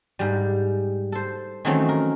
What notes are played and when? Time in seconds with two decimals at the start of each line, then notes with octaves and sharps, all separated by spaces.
0.19 G#2 G3
1.12 A4 C5
1.65 D#3 E3 F#3 A3 C4 C#4
1.89 A#4